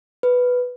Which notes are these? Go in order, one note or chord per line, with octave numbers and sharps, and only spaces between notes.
B4